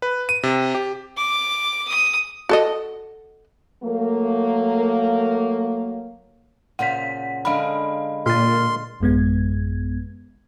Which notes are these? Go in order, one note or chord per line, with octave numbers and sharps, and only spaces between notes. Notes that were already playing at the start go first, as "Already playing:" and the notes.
B4
D#7
C3
G4
D6
D#6
F#4 A4 D#5
F#3 A3 A#3
A#2 C#3 C5 F#5 B6
D3 G#3 A#4 F5 B5
A#2 C6 F6 A6
A1 F#2 G#3 B3 G#6